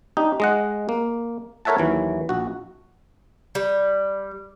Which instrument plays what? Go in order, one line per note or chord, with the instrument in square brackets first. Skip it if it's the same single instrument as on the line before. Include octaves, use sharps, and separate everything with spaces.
[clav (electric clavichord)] D4 D#4 G4
G#3 D#5 F#5
A#3
A4 A#4 C#5 E5 F#5 A5
D#2 E3 F#3
A#1 F#4
[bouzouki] G3